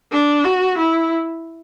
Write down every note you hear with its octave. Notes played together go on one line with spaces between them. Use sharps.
D4
F#4
E4